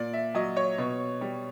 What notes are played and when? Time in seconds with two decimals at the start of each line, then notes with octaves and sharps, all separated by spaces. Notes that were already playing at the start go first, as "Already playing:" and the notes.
Already playing: A#2 D5
0.13 E5
0.35 F#3 D#5
0.57 C#5
0.78 B2
1.21 G3